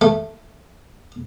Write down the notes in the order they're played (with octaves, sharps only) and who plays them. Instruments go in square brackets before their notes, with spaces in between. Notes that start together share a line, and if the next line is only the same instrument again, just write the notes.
[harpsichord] A3